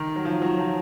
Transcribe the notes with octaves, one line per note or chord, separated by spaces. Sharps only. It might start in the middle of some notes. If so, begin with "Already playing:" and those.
Already playing: D#3
F#3
F3
F#3
F3